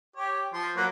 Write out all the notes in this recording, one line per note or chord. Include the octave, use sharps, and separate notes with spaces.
G4 C#5
F3 C6
F#3 A#3 B3